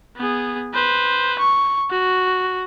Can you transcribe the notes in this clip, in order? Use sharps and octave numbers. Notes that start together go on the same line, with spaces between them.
B3 G#4
B4 C5
C#6
F#4